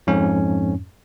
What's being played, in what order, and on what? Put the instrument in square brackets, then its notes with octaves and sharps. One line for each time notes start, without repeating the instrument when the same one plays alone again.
[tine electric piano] F2 G#2 C#4